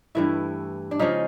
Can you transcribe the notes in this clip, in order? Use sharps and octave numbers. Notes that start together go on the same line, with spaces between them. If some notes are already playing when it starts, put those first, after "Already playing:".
G2 E3 A3 E4
D4
C#3 F3 G#3 D#4